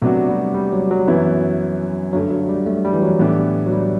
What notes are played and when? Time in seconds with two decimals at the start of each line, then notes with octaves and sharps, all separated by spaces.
0.02 C3 F#3 A3 B3 D4 F#4
0.28 G3
0.54 G3
0.72 F#3
0.90 F#3
1.07 F#2 E3 B3 E4
2.13 G2 D3 F#3 A3
2.30 F#3
2.49 G3
2.66 A3
2.84 G3
2.93 E3
3.02 F#3
3.20 A2 E3 B3 D4 G4
3.66 F#3
3.73 G3